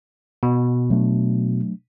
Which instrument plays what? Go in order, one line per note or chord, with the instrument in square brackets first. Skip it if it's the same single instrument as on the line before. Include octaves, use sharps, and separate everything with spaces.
[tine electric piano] B2
[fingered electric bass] F#3 A3 D4